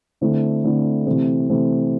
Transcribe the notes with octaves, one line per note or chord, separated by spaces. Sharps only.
D3 A3 C4 E4
D3 A3 C4 E4
C3 E3 A3 C4
C3 E3 A3 C4